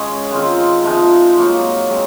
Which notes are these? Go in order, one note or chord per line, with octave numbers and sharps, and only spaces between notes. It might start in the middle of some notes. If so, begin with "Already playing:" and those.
Already playing: C#3 G#3 C#4 G#4
D#3 G#3 C4 F4
C3 F3 G#3 D#4
F#3 A#3 D#4
G#3 C4